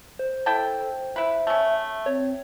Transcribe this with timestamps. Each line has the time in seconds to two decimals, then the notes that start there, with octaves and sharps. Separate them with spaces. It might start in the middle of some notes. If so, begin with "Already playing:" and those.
0.19 C5
0.46 E4 A4 G5 A5
1.16 E4 B4 E5
1.47 A3 C#4
2.06 C4 C#5